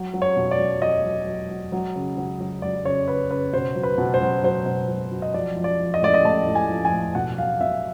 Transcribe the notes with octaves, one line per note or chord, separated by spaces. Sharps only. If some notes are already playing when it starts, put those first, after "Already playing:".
Already playing: F#3
F#3
C#5
B2
D5
F#3
F#3 D#5
F#3
F#3
F#3
F#3
C#3
F#3
F#3
F#3 D5
C#3 C#5
C#3 B4
C#3 B4
B2 C5
F#3
B4
B2
C5
F#3
F#3 C5
B2
F#3
F#3
D#5
F3 D5
F3
D5
F3
D#5
A2 D5
D#5
A2 A5
A2
G#5
F3
G#5
A2
B2 F#5
F#3 F5
B2 E5